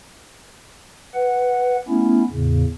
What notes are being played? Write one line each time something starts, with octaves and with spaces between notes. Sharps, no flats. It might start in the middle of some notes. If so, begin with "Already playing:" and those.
B4 F#5
A3 B3 C#4 E4
E2 A2 C#3